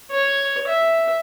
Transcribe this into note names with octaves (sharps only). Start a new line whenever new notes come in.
C#5
E5